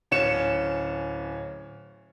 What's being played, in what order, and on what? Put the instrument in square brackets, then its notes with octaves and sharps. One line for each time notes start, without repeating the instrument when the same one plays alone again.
[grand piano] D1 C#4 C#7 E7